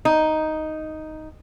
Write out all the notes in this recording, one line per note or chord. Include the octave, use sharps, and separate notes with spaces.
D#4